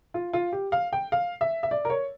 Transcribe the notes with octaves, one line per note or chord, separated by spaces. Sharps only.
F4
F4
G4
F5
G5
F5
E5
E5
D5
A#4
C#5